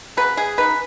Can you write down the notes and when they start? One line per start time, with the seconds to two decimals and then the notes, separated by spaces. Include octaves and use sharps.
0.17 C#3 F#3 B3 B4
0.37 G#4
0.58 C#3 F#3 D#4 B4